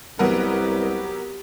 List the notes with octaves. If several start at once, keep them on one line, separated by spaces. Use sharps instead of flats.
C2 F#3 B3 G4 A#4 B4